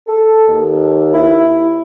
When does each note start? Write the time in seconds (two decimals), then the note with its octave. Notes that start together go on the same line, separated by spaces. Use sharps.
0.07 A4
0.48 D#2
1.13 E4